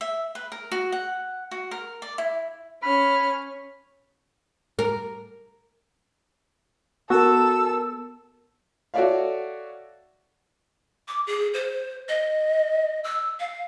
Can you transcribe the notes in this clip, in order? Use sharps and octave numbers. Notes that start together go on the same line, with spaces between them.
E5
B4
A#4
F#4
F#5
F#4
A#4
D5
E4
C#4 B5 F6
A#4
B3 F#4 A4 A#4 E6
F#4 A4 C#5 D5 E5 F5
D6
G#4
C5
D#5
E6
F5